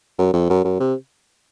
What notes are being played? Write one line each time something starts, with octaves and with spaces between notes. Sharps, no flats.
F#2
F2
F#2
F#2
C3